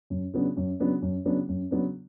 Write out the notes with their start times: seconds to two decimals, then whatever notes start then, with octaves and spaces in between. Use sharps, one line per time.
0.10 F#2
0.34 C#3 F#3 B3 D4
0.57 F#2
0.80 C#3 F#3 B3 D4
1.02 F#2
1.25 C#3 F#3 B3 D4
1.49 F#2
1.71 C#3 F#3 B3 D4